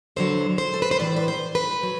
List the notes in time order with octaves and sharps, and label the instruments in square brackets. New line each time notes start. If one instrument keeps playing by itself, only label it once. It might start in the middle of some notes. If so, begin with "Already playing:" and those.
[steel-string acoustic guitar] E2 D3 F#3 C5
C5
A4
B4
C5
A2 E3 D5
B4
C5
B4
F#3